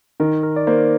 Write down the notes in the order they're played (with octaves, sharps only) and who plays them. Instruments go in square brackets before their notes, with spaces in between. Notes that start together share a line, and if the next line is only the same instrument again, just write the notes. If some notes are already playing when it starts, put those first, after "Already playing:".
[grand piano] D#3 [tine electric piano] A#4
[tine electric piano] A#4
D5
[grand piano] A#3 [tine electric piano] C5